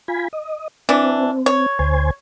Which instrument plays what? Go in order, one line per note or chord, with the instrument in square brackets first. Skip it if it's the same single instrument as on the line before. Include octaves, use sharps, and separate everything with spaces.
[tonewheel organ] F4 G#5 B5
D#5
[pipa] E3 D4 [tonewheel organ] C4
[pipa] C#5
[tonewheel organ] D2 C5 G#5